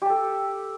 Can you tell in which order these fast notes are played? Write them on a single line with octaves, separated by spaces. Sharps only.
G4 A5 A4